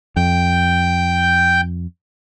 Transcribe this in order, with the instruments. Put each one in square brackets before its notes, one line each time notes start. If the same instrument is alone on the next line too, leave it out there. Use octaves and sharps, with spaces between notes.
[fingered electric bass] F2 [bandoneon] G5 G6